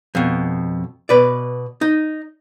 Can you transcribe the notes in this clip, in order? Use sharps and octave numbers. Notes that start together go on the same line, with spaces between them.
F2 B2
B2 B4 D5
D#4